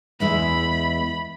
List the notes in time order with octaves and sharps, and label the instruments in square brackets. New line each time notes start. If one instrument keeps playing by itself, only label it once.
[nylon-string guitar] E2 G#3 E4 [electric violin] B5